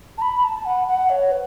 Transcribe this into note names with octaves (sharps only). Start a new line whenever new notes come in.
A5
B5
A5
F#5
F#5
C#5
B4